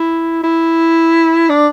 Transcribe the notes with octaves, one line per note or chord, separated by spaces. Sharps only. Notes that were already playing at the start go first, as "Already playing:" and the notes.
Already playing: E4
E4
D4